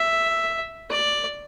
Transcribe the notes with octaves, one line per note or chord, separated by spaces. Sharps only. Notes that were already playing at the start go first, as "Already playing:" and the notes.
Already playing: E5
D5